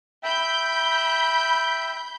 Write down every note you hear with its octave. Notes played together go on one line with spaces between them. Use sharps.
E5 G5 B5 G6